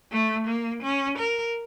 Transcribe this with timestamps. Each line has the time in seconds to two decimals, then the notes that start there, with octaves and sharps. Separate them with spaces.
0.12 A3
0.47 A#3
0.83 C#4
1.18 A#4